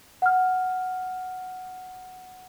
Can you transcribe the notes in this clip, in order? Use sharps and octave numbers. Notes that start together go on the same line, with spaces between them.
F#5 F6